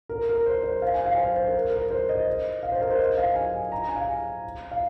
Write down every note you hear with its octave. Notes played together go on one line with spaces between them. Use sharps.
A#4
A#4
C5
C5
F5
G#5
F5
C5
C5
A#4
A#4
C5
D#5
F5
C5
A#4
C5
D#5
F5
G#5
A#5
G#5
F5
F5